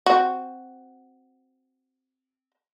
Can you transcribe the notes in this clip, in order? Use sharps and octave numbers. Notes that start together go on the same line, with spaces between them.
C4 F#4